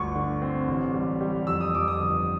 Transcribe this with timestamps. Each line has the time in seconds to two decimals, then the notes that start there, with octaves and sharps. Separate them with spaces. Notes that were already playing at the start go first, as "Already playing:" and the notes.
Already playing: G1 D2 C#6
0.15 D3
0.41 C4
0.68 A1
0.94 G3
1.20 G3
1.47 F2 E6
1.60 D#6
1.74 F2 D6
1.88 D#6
2.00 G1